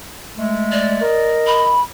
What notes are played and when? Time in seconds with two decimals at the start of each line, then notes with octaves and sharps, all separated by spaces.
0.36 G#3 A3
0.72 D5
1.00 A#4 D#5
1.47 B5